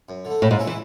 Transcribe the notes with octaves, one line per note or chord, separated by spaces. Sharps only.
F#2
D3
A3
A2 C#3
G#2
G#3 C#4 E4
E3